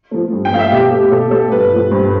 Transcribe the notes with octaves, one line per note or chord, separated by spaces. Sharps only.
F3 A3
G2
G5
F3 A3 F5
E5
B2 G4
A3
B2 A4
A3 A4
G2 B4
F3 A3
G2 C5